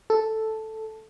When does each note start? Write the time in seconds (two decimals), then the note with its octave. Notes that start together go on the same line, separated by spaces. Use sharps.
0.10 A4